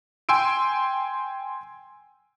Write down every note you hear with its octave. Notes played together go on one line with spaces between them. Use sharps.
G5 G#5 C6 E6 D7